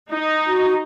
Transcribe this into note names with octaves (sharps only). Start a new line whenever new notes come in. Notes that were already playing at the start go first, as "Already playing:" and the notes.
D#4
F#4